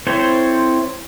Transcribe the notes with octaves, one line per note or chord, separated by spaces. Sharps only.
C4 E4 A4 C5 C#5